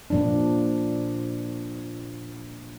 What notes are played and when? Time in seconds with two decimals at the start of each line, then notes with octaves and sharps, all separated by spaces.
0.10 A#2 F3 D4